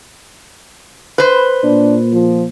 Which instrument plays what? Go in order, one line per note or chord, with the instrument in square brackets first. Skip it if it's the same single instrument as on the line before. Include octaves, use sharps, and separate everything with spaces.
[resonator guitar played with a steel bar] B4 C5
[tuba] A#2 [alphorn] D4
[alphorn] F3